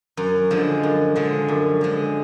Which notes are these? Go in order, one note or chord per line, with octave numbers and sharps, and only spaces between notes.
F#2
D3 F3 G#3
F#2
D3 F3 G#3
F#2
D3 F3 G#3